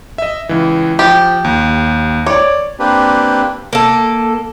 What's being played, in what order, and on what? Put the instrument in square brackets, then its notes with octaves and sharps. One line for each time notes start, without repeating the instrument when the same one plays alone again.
[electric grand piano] D#5 E5
C#2 E3
[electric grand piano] F3 [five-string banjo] G4
[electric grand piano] D#2
[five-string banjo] C#5 [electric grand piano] D5 D6
[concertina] A#3 C4 D4 G4 B4
[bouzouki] A#3 A4